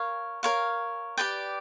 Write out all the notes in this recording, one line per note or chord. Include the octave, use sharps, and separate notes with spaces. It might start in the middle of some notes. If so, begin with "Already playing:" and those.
Already playing: A#4 C#5 F5
A#4 C#5 F5
G4 B4 D5 G5